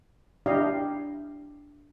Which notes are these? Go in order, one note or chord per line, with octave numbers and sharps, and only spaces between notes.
D4 E4 G4 D#5 F5